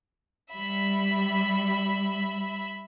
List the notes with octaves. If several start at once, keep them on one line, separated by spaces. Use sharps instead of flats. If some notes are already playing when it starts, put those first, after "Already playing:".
G3 E5 B5